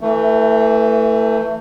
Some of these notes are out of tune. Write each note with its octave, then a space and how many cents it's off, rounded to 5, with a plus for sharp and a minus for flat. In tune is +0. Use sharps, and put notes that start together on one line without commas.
E3 +0 A3 +25